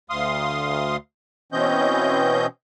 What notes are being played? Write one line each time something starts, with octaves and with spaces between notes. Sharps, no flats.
D2 F5 C6 D#6
B2 E3 C4 C#4 D#5 G6